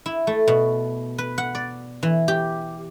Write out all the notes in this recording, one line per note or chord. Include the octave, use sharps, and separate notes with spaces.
E4
A3
B2
B4
F#5
D5
E3
G4